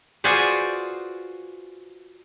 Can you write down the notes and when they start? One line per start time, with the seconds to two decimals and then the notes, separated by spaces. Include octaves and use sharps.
0.24 F4 F#4 G#4 B4 C5 D5